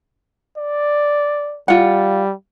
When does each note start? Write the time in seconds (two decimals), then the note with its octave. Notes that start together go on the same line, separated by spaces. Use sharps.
0.57 D5
1.68 G3 F4 F#5